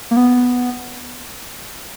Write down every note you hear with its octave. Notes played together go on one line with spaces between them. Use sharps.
A#3
B3